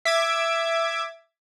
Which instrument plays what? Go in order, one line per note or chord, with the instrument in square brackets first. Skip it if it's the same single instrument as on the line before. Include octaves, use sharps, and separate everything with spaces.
[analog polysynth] E5 D6 G#6